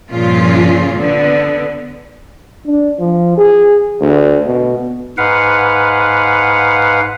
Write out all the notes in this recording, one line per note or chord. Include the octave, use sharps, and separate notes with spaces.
G2 A#2 C#3 F3 F4
D3 B3
D4
F3
G#4
D2
B2
G#2 B4 F5 F#5